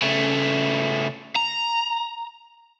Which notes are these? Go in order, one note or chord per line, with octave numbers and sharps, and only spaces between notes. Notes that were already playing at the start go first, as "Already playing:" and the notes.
C#3 A3
A#5